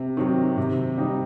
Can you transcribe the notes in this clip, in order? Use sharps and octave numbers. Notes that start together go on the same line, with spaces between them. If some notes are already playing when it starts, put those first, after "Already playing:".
Already playing: C3
D#3 F#3 C4
C3
D#3 G3 C4 D#4